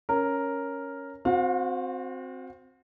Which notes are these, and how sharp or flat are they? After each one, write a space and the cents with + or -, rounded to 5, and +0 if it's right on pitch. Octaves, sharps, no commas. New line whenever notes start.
C#4 +0 A#4 +0
C4 +0 F#4 -25 F5 +30